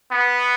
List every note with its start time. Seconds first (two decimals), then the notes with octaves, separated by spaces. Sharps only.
0.12 B3